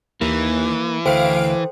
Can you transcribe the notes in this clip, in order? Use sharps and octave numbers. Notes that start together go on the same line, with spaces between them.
D#2 E3 A#3
D2 A4 C5 F5 G5 D7